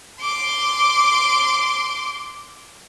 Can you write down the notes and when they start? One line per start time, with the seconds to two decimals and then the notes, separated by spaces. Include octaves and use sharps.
0.22 C6 D6